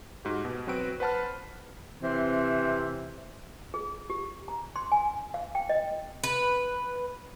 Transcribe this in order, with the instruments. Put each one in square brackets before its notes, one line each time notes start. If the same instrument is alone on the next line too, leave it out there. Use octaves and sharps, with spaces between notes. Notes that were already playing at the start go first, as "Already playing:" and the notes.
[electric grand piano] G#2 F#4 G4
B2
F#3 C4 F#4 B4 D7
B4 C5 F#5 A5 B5 F6
[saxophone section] C3 E3 C4
[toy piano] G#4
G4
A#5
C6
G#5
F5
G5
D#5
[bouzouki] B4